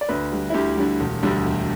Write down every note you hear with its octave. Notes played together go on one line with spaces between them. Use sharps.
D5
D2 B4
D3 G3
E4
D2 G4
D3 G3
E1
D2 D3 G3
E1